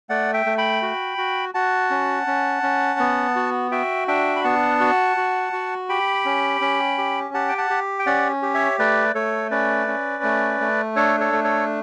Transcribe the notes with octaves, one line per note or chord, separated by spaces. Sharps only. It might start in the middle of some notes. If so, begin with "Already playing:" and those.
A3 D5 F#5
E5 G5
A3
G5 B5
F#4
F#4
F#4 F#5 A5
C#4
C#4
C#4
B3
F#4
F#4 E5 G5
D4 E5 G5
B5
B3 F#5 A5
F#4
F#4
F#4
G4 G5 B5
C#4
C#4
G4
G4 F#5 A5
G5
F#5 A5
G4
G5
C#4 D5 F#5
G4
C#5 E5
A3 B4 D5
A3 A4 C#5
C#4 B4 D5
C#4
A3
A3
D4 A4 C#5
A4 C#5
A3
A4 C#5